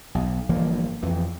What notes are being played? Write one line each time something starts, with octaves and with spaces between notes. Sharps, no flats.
B1
G1 E3 F3 A#3
F2 E3